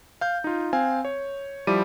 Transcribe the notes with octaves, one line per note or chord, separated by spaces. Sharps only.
F5 G6
D#4 F4
C4 F5 G#5
C#5
F3 G3 E4 D6 D#7